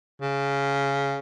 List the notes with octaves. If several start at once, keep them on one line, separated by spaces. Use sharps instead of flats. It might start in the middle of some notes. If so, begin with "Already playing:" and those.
C#3